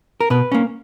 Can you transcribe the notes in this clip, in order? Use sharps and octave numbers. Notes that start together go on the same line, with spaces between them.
A#4
B2 B4
A#3 C#4